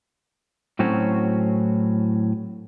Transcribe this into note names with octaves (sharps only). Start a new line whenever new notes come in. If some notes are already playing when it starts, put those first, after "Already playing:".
A2 F#3 C4 C#4 F#4